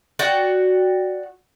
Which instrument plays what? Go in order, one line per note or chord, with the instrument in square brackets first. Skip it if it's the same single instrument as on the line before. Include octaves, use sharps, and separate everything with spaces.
[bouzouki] F#4 D5 G5